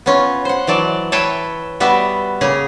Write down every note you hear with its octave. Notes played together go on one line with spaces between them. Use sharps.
B3 C#4 F4
C5 F#5
E3 F#3 D5 A5
B4 C#5 E5 G5 A5
G3 B3 F#4 E5
C#3 A#3 G#4